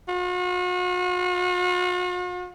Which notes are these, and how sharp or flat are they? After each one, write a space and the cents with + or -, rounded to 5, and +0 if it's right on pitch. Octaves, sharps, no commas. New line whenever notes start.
F#4 -45